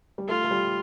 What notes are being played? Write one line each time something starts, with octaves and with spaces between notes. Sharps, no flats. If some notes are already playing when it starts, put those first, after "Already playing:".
G3
A3 F4
A3
G3